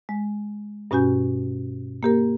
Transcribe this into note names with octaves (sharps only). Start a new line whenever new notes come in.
G#3
G2 B2 C#4 F#4 G#5 G6
A#3 G4 A#4